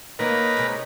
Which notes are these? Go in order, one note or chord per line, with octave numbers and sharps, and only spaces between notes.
D#3 A#3 D#4 A#4 B4 C#5 D#5
C3 G#3